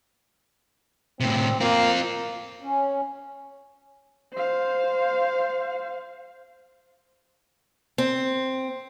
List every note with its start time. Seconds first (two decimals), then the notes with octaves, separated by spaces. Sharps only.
1.20 A2 C3 C4
1.61 A#3 C4 F4
2.62 C#4
4.33 C5 F5
7.98 C4